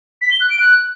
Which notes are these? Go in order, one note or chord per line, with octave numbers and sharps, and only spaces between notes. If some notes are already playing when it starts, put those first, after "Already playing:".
B6
G7
F#6
D7
F#6